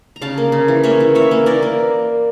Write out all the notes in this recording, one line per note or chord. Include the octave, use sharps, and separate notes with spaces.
A#5
C#3 F5 A5
A#3
C#3
E3
A#3 C#5 E5
E3
E3 C#5 E5
A#3
E3 A#4 D5
A#3